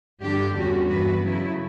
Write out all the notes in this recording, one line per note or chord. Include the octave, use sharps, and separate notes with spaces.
G2 D3 G3 D4 G4
E2 D3 G3 C#4 F#4
G2 E3 B3 F#4 B4
C#3 F#3 A3 E4